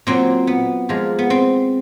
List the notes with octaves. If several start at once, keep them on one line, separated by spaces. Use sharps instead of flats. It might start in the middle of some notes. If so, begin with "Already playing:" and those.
A#2 F#3 C4
B3
A#2 F3 G#3
B3
C4